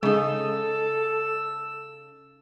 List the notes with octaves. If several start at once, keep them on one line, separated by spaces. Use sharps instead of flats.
C#3 G#3 D#4 A4 E6